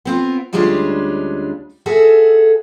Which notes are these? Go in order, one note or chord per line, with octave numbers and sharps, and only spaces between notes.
B3 C4 F4
D2 G3 G#3 C#4 D4 F4
F#4 G#4 A4 E5